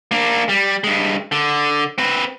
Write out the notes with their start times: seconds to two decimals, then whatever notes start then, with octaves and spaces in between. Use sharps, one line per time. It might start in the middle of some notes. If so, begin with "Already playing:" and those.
0.11 A#3 D4
0.49 G3
0.84 G2 G#3
1.32 D3
1.98 C4 B4